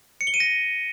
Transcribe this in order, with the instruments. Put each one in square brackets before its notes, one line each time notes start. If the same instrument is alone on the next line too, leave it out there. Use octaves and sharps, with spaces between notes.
[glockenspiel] C#7
G7
D#7
A#6